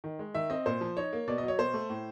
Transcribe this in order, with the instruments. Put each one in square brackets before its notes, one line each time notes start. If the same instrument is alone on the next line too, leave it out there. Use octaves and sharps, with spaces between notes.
[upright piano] D#3
G#3
D#3 E5
C4 D#5
A#2 C5
F3
D#4 C#5
A#3
B2 D5
D#5
F#3
C#5
B2 C5
A3
A2